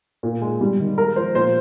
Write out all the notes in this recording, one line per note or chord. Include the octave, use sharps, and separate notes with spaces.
A#2
G#3
G3
D#3
G#3 A#4
F3 C5
A#2 C5